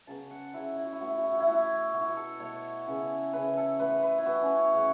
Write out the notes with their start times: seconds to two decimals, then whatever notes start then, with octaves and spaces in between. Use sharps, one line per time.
0.07 C#3 F#3 B3 A5
0.31 F#5
0.54 C#3 F#3 B3 E4
0.77 E4
0.85 F#4
0.93 E4
1.00 A2 E3 A3 F#4
1.08 E4
1.16 F#4
1.24 E4
1.32 F#4
1.40 E4
1.47 A2 E3 A3 F#4
1.55 E4
1.93 B2 A3 F#4
2.01 E4
2.08 F#4
2.17 A4
2.39 B2 A3 C#5
2.87 C#3 E3 B3
3.33 C#3 E3 B3 B4
3.57 A4
3.79 A2 E3 B3 B4
4.03 B4
4.18 E4
4.26 A2 E3 B3 F#4
4.42 C#4
4.56 C#5
4.73 C#3 A3 F#5